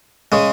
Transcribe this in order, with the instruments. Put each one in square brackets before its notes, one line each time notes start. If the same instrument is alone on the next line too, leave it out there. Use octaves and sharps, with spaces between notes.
[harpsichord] C#3 G#3